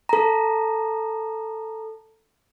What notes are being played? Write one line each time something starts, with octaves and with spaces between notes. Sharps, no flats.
A4 A#5